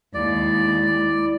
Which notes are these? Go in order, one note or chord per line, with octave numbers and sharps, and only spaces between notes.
D#2 G#3 E4 D5